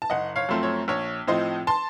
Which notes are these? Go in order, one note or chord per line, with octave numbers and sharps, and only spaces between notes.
A5
F#1 D#5 F#5
C#5 F5
F#2 F3 A3 C4
C#5
A#1 C#5
A2 F3 C4 C5 D#5
A5 C6